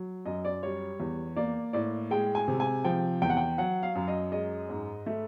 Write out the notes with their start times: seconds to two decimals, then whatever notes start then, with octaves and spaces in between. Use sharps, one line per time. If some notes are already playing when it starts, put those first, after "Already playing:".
Already playing: F#3
0.25 F#2 D#5
0.45 D5
0.63 G3 C#5
1.00 E2
1.36 A#3 D5
1.73 A2 D5
2.11 G#3 G5
2.35 G#5
2.48 C3
2.60 G#5
2.84 F3 G5
3.22 E2 G5
3.30 F#5
3.37 G5
3.58 F#3 F#5
3.83 F5
3.95 F#2
4.08 D#5
4.32 G#3 D#5
4.69 G#2
5.06 A3 E5